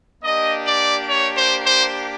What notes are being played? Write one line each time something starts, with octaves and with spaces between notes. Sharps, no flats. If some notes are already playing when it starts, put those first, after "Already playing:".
A#3 D4 G4 D#5
D5
C#5
C5
C5